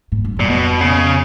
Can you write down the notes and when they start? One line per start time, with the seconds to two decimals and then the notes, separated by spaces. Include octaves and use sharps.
0.12 G#2
0.25 G2
0.37 F#2 A#2
0.49 F2 B2
0.81 C#3